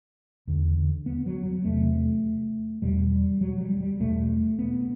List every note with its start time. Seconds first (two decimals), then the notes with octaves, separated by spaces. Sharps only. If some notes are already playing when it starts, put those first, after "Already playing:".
0.47 E2 D3
1.06 B3
1.26 F#3
1.46 F#3
1.65 E2 C3 A3
2.82 E2 B2 G3
3.41 F#3
3.61 G3
3.80 G3
4.00 E2 B2 A3
4.59 B3